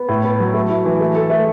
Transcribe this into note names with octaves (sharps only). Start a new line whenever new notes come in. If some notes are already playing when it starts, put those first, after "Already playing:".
Already playing: B3
A2
B3
F#3
A3
E4
E3
A3
A4
A3